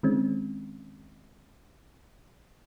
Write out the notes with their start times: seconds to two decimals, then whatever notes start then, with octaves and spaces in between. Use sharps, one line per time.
0.03 D#3 G#3 C4 C#4